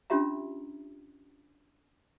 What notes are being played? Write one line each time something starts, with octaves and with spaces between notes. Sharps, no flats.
C#4 D4 F4 G4 E5 A#5